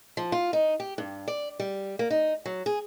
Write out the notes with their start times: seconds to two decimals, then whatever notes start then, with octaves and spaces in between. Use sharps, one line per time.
0.17 F3
0.32 F4
0.53 D#4
0.80 G4
0.98 G2
1.28 D5
1.60 G3
1.99 A#3
2.11 D#4
2.46 F#3
2.66 G#4